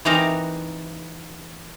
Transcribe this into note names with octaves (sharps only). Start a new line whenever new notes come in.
E3 C4 D#4 F#4 G4 A#4